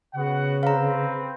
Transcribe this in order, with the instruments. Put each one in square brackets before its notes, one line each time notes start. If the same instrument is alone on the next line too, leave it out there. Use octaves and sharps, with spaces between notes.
[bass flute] C#3 [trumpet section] B3 F#4 F#5
[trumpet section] C4 B4 [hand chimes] F5 A#5